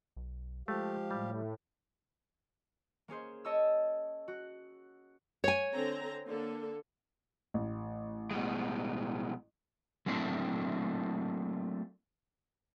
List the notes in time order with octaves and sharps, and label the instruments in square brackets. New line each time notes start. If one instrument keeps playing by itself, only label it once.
[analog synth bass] B1
[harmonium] F3 G4 F5 [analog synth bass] G#3 [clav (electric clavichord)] A3
[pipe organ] A2 [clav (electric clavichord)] G3
[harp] A#3 C#4 G#4 C5
C#5 D#5 A5 C#6 D#6 E6
F#4
[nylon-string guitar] C#5 G#5
[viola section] D3 C4 A#5
D3 A#3 A4
[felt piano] A1
[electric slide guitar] B2 G3 G#3
F#3 A3 A#3 C4 D4 E4